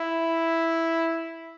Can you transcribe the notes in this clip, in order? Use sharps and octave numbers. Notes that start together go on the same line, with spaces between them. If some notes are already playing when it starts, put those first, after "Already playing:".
Already playing: E4